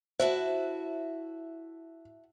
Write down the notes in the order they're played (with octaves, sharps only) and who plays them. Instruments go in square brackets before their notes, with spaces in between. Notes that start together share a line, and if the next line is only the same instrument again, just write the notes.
[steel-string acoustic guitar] E4 F#4 A5 [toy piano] C5 [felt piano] E5